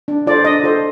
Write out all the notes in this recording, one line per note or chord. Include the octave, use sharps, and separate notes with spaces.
D4
F4 A4 C5 D5
D4 D#5
F4 A4 C5